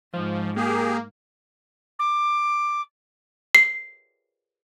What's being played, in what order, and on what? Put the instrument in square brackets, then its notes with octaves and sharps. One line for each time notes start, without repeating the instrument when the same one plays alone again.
[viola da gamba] G#2 [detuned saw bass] F3
[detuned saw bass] A#3 [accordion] G4 G#4
[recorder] D6
[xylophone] C7